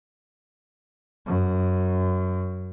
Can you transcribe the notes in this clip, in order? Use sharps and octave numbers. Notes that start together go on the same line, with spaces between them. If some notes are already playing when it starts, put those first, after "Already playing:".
F#2